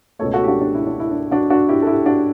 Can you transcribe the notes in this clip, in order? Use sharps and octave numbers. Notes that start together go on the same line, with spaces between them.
C#2 B2 A3 A4 C#5
F#4 A4
G4
D4 F#4
D4
E4
D4
E4
D4
D4 F#4
D4 F#4
E4 G4
A4
E4 G4
D4 F#4